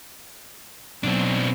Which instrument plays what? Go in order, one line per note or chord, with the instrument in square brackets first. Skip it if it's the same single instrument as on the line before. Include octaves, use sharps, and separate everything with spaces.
[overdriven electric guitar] B1 B2 [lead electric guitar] C4 D4